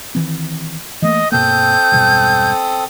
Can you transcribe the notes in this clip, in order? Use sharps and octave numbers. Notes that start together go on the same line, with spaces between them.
D#3 E3 C4
E3 A3 A#3 D#5
G2 B2 A#3 C4 A4 D#6 G6
E1 G2 B2